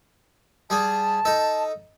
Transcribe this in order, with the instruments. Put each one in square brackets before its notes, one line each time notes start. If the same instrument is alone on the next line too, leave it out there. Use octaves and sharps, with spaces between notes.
[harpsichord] G3 G#4 [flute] A5
[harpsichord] D#4 A4